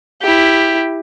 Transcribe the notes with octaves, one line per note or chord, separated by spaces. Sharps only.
E4 G4